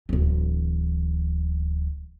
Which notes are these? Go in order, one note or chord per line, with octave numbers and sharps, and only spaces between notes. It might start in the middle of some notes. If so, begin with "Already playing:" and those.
D1 E3